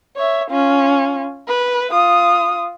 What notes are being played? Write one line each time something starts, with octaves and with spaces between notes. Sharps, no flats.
C#5 E5
C#4 F4
B4
F4 D#6